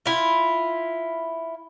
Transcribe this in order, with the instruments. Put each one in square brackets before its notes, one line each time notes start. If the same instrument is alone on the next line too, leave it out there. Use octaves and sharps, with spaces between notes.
[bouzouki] E4 F4